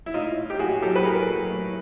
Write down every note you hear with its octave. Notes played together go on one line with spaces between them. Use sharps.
E4
A2 D#4 F4
A2
G4
A2 F#4 G#4
F#3 G4 A4
B4
F#3 G#4 A#4
F#3
A2